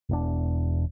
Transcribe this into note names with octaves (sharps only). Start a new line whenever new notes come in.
E1 E2 D4